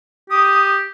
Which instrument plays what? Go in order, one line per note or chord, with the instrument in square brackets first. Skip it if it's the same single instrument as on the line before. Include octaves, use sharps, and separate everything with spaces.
[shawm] G4 [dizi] D#6